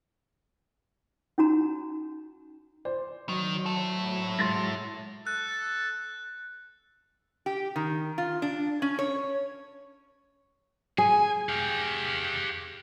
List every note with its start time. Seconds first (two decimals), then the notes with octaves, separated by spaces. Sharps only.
1.38 C#4 D#4 F#4 A#5
2.85 C5 D5
3.29 D#3 F#3
3.66 E4 A4
4.39 G#3 C6 A6 A#6
5.27 A4 F#6
7.46 G4
7.76 D#3
8.18 F4
8.42 D4
8.82 C#4
8.99 C#5
10.98 G#4 G#5
11.49 G4 F5